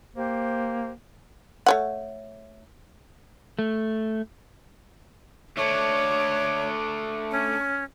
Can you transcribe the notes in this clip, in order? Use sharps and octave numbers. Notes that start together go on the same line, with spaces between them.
A#3 G4 C5
A3 C#5 F#5
A3
A3 D4 C#5
C#4